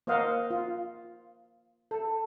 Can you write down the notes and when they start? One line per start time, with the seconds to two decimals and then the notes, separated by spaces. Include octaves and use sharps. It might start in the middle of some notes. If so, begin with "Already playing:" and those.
0.07 A#3 C5 D#5 F5 F#5
0.50 F4
1.91 A4